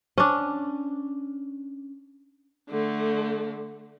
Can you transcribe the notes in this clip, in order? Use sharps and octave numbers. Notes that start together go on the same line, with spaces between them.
C#4 D4
D3 A3